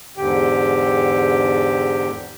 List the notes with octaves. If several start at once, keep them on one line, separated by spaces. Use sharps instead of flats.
E2 G#2 D3 G4 G5